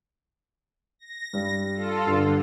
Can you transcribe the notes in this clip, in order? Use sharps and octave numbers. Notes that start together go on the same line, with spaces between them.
A#6
G2 G3
F4 A4
G2 D3 C7